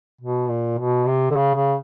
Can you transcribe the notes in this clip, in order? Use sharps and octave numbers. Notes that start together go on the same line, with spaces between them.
B2
A#2
B2
C3
D3
C#3
C#3